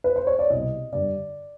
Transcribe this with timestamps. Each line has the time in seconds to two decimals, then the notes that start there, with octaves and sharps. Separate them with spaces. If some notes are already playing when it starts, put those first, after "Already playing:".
0.04 B4
0.16 C5
0.27 C#5
0.39 D5
0.50 C2 B2 D#5
0.92 G2 D3 D5